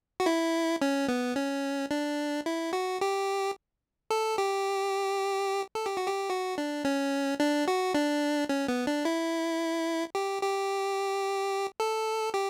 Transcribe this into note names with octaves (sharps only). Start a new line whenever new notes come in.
F#4
E4
C#4
B3
C#4
D4
E4
F#4
G4
A4
G4
A4
G4
F#4
G4
F#4
D4
C#4
D4
F#4
D4
C#4
B3
D4
E4
G4
G4
A4
G4